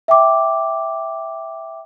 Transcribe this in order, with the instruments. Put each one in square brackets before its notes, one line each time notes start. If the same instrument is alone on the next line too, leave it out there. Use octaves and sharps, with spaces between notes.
[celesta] E5 G5 D6